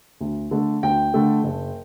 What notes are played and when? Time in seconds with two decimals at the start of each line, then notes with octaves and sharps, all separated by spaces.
0.21 D2
0.51 D3 A3
0.83 D2 G5
1.14 D3 A3
1.44 F#1